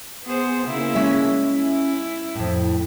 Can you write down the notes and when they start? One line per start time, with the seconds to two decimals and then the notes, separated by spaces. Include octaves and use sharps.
0.24 B3 G#4 C5
0.66 C#3 A#3 E4
0.95 G#3 C#4 E5
1.43 E4
2.36 F2 A2